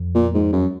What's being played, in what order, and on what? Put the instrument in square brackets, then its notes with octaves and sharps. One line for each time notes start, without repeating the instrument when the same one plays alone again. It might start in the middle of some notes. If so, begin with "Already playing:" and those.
Already playing: [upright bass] F2
[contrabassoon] A#2
G#2
F#2